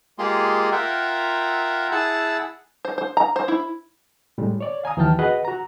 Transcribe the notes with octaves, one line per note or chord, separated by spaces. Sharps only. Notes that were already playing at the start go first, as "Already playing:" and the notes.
G#3 A#3 F4 G4 G#4 C6
F4 A#4 E5 F#5 G5
E4 G#4 F#5 A5 E6
C5
C5
A#5
C5
E4
A2 G3 G#3
C#5 D5
F5 G#5 A#5 D#6
D#2 E3 F#3 G5 A5 F6
F#4 G#4 B4 D#5 F#5
F#4 A#5